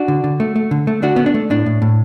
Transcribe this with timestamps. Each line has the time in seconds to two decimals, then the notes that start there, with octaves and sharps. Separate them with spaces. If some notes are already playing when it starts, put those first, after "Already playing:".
Already playing: D4 F#4
0.08 D3
0.24 D3
0.40 A3
0.56 A3
0.71 D3
0.87 A3
1.02 D3 D4 F#4
1.16 D3 B3
1.26 D4
1.34 A3
1.50 A2 D4
1.66 A2
1.82 A2